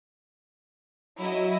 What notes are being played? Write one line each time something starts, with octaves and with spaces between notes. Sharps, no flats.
F#3 E4 D#5